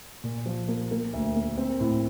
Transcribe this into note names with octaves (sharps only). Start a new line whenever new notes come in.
A#2
F3
A#3
A#3
D2
A#3
C4
A2